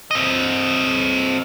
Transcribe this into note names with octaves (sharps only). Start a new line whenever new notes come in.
C4 D#5